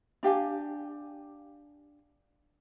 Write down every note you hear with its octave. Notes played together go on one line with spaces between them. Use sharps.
D4 G4 F5 G#5